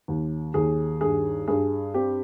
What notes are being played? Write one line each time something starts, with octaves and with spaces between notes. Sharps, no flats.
D#2
D#2 G#4
G2 G#4
G2 G#4
C4 G4